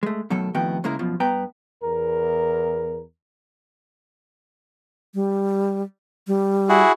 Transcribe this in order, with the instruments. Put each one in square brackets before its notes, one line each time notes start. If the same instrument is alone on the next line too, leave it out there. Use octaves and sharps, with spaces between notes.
[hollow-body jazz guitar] G#3 A3
B2 D#3 F#3 A3 A4
F2 A2 D#3 B3 F#4 G5
C#3 G#3 A#3 E4 A#4
F#2 B2 F3
G2 B3 G5 A#5
[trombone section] E2 A#4
[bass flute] G3
G3
[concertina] E4 F#4 G#4